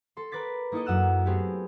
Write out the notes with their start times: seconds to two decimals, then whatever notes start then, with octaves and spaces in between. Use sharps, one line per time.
0.17 A4 C6
0.32 A#4 B4 D6 A6 B6
0.72 A#3 D#4 E4 A4 D#5
0.86 F#2 F#5 E6 F#6
1.26 A3 B3 C4 G4 G#4